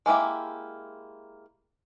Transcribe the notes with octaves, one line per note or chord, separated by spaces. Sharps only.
G#3 A#3 E4 G4